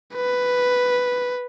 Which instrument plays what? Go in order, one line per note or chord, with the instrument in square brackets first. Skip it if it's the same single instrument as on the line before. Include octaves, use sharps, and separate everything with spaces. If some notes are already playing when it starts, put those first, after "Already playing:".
[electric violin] B4